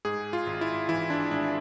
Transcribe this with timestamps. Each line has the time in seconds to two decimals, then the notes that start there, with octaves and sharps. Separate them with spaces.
0.05 G#2 G#4
0.33 F4
0.47 G#1
0.61 E4
0.89 E3 E4
1.10 D4
1.31 G#1 D4